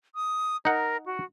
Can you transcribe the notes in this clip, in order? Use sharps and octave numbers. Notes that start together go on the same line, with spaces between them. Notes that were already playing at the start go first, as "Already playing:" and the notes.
D#6
D#4 A#4 F#5
F#4